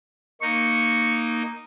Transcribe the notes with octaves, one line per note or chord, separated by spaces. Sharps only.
A#3 D#4 C#6